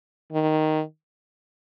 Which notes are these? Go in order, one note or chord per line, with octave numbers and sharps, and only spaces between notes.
D#3